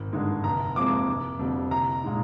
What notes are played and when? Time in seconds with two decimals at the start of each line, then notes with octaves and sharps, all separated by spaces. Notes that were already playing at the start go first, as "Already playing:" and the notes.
Already playing: G#1
0.13 G2 D3 G#3 D#4
0.44 F1 A#5
0.76 F2 C3 F3 G#3 D6
1.08 F1
1.39 F2 D3 G3
1.71 C2 A#5
2.04 A#2 G#3 D#4